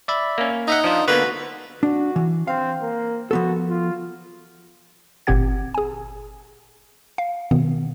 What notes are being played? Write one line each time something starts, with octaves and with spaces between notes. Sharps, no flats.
D5 E5 B5
A#3 C#4
D#4 D#5 E5 F#5
F3 D4 F4
D3 A#3 B3 F#4 B4
D4 F#4
E3
C4 F5
A#3
F3 B3 F#4 A4
F4
G1 A#2 C4 G4 F#5 G#6
G#4 G#5
F5
B2 D#3 B3